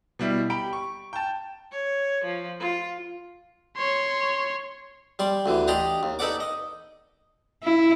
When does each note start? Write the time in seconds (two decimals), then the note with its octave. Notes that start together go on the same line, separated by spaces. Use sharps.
0.19 B2 G3 E4
0.50 G4 G5 B5 D7
0.73 C#6
1.13 G5 A5
1.72 C#5
2.24 F3
2.60 F4
3.77 C#5 C6
5.19 G3 D5 C6
5.46 D2 D3 E3
5.68 D4 G4 D5 D#5 A#5 C6
6.03 D#2
6.19 D#4 A4 B4 D5 F#5 D6
6.40 D#5
7.63 E4